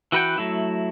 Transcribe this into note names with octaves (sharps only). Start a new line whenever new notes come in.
E3 F#4 B4 F#5 G5
F#3 A3 E4